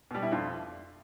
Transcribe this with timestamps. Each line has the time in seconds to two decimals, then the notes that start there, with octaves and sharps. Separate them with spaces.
0.11 B2 G3
0.23 E4
0.32 F2 F4